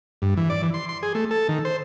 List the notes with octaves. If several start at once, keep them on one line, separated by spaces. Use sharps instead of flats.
G2
E3
D5
E3
C6
C6
G#4
A3
A4
D#3
C5